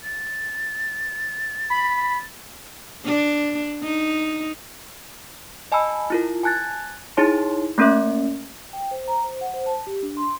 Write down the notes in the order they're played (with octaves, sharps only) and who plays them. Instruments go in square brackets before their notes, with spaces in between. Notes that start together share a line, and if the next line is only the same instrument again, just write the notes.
[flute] A6
[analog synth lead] B5
[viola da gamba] D4
D#4
[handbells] D#5 G#5 A5 B5 E6
E4 F4 A#4
G#5 A5 F#6 G#6 A6
D#4 E4 G#4 C#5 A5 C6
A3 A#3 C#4 A#4 E5
[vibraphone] G5
C5
A#5
C5
F#5
C5
A5
G4
D4
C6